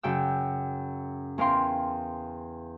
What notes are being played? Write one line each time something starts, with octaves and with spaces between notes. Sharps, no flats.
F#2 C#3 G5 E6
E2 C#4 A#4 F5 G5 C6